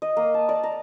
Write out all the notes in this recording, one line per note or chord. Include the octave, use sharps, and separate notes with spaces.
D#5
A#3
A5
D5
A#5